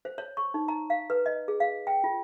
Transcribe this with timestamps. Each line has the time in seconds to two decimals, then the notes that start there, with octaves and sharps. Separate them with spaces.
0.05 C5
0.18 C#5
0.37 C#6
0.54 D#4
0.68 A#5
0.90 F5
1.10 B4
1.26 D#5
1.48 G#4
1.60 F5
1.87 G5
2.04 F4